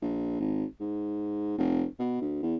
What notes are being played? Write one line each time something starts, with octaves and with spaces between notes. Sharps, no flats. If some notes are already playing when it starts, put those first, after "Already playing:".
A#1
G#1
G#2
F1
B2
D2
E2